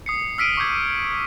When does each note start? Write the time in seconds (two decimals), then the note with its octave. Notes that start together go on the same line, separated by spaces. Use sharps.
0.06 D#6 C7 C#7
0.38 E6 F6 B6 C7 D7 D#7
0.57 C#6 D6 G6 G#6